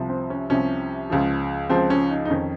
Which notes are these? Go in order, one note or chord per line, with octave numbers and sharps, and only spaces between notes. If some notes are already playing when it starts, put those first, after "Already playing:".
Already playing: C2 C3 F3
C4
C#4
C2 C3 F3 C#4
C#2 C#3 F3
C#2 C#3 F3 C4
C#4
D#4
D#4
F2 D#3 C#4